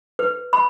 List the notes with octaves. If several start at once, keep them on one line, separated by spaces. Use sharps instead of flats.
B4
B5